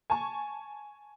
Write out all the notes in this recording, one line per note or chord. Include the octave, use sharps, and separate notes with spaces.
G#5 A5 C#6